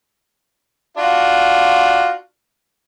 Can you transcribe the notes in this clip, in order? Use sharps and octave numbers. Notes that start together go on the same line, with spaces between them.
D4 F4 F#4